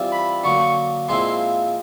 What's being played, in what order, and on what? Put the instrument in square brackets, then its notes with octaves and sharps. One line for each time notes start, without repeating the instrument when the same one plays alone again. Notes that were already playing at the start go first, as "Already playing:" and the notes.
Already playing: [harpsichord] E3 G3 C4 F4
[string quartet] B5
[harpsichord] D3 F#3 A#3 [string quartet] C#6
[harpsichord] A#2 F3 G#3 C4 E4 [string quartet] C6